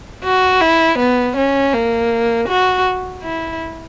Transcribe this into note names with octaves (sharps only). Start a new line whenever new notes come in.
F#4
E4
B3
C#4
A#3
F#4
E4